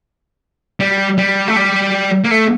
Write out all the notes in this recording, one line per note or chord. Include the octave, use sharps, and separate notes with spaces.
G3
G3
A3
G3
A#3
A3